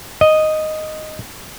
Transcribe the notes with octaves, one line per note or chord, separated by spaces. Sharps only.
D#5